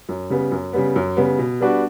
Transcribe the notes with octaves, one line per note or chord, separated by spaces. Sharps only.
F#2
C#3 G3 B3
F#2
C#3 G3 B3
F#2
C#3 G3 B3
B2
G3 B3 D4 F#4